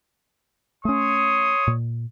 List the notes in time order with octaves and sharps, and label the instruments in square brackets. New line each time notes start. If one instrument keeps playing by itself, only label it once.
[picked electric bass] A3 C#4 [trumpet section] C#5 C6 D#6
[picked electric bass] A#2